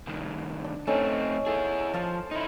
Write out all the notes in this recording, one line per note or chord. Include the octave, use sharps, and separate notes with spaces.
C2 D#3
D4
A3 C4 C#4 D#4 A4
E4 G#4 A4
F3 C5 F5 A5
D#4 E4 C6